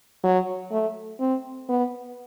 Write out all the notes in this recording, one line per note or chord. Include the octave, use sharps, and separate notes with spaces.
F#3
A3
C4
B3